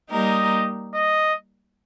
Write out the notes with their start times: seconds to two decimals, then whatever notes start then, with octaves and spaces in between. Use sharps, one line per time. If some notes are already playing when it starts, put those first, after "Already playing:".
0.10 G3 A#3 D#4 G4 A#4 D#5
0.94 D#5